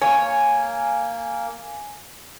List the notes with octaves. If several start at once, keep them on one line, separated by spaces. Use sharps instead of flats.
A#3 C#5 G#5